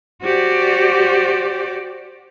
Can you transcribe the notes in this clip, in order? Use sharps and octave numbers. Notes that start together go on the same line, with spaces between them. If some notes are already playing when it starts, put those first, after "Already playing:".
F#4 G4 C5 D5